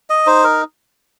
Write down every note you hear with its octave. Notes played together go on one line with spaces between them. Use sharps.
D#5
D#4 C5
A#4